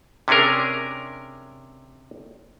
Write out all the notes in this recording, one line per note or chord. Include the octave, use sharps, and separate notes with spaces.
C3 C#4 D4 G#4 A#4